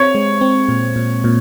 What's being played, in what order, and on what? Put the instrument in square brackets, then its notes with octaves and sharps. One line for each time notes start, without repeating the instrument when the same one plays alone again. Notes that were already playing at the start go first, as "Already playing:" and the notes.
Already playing: [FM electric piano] C4 [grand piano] C#5
[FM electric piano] G#3
C4
A#2
A#2
A#2